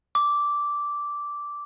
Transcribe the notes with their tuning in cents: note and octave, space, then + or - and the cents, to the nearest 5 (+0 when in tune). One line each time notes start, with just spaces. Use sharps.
D6 -10